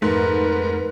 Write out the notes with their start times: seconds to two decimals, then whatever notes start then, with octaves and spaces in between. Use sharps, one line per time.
0.02 F2 G#2 A3 A#4 B4